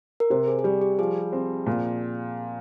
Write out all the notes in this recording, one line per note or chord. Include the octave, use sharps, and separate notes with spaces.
A#4
C3 C5
G#4
G#4
G3 G4
G4
F3 G#4
C4
A#2